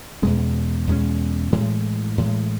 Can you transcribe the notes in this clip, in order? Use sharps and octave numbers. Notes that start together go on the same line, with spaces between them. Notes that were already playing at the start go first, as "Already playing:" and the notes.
E2 B2 G#3 C#4
E2 B2 G#3 C#4
A2 E3 G#3
A2 E3 G#3